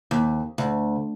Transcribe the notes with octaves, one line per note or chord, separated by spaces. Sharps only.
D#2
D2